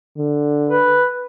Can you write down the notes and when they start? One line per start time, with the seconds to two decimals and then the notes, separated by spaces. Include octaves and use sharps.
0.18 D3
0.69 B4